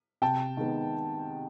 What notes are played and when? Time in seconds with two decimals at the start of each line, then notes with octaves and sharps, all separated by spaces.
0.22 C3 G5 A5
0.57 D#3 G#3 B3